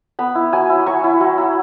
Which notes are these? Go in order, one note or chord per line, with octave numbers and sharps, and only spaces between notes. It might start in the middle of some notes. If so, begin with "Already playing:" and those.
B3 B5
E4
F#3 G#5
E4
F#3 C#6
E4
F#3
E4